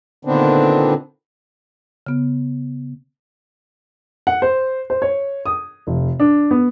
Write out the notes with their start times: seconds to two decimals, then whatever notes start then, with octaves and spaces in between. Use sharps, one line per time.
0.25 A#2 D3 D#3 B3 C4 D4
2.07 C#3 B3
4.27 F#5
4.42 C5
4.90 C5
5.02 C#5
5.46 D#6
5.87 F1
6.20 D4
6.51 B3